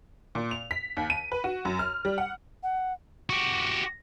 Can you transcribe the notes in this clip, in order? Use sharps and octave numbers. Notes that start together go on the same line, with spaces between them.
A#2
F7
B6
D#2
D#7
B4
F#4
F#2
F6
G3
F#5
F#5
F#4 G4